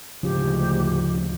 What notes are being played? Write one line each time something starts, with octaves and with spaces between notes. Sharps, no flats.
D2 G#2 C#3 F3 G4